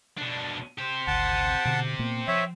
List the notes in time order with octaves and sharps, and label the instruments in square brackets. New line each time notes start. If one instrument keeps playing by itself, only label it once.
[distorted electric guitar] B2 D4
G4 C5
[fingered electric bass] G#1 D2 [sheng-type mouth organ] F#5 A5
[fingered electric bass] B2 D3
A#2 A#3 B3
[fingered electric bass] F3 [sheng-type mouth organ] C#5 E5